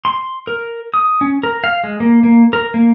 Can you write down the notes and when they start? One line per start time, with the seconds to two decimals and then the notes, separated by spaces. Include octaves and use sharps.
0.05 C6
0.47 A#4
0.94 D#6
1.21 C#4
1.43 A#4
1.64 F5
1.84 G#3
2.00 A#3
2.23 A#3
2.53 A#4
2.74 A#3